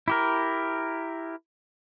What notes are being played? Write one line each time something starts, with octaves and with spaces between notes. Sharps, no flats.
E4 G4 A#4